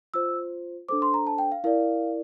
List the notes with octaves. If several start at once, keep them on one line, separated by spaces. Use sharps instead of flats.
F4 C5 E6
D4 A4 C5 D6
C6
A#5
A5
G5
F5
E4 A#4 D5 F5